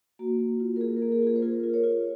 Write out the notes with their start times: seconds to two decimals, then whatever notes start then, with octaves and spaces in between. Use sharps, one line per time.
0.19 A#3 F#4
0.39 A#3
0.60 F4
0.76 A#4
0.81 A#3 G#4
0.97 A#4
1.02 A#3
1.12 G#4
1.22 F4 G#4
1.36 C5
1.42 F4 A#4
1.64 F4
1.74 C#5
1.84 F4